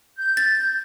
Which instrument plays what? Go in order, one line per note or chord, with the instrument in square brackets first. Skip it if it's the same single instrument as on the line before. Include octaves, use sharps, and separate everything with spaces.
[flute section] G6
[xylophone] A6